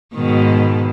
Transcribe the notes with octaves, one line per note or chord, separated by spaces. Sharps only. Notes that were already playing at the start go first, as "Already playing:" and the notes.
G#2 B2 D#3